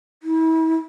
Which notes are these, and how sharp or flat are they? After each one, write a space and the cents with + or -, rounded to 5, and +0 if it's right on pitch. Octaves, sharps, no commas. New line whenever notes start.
E4 -40